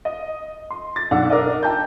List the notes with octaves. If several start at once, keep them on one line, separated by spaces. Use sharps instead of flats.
D#5
C6
A6
B1 D4 F#5 E6
D4 A#4 D5 D#5
G5 A5 A#5 G6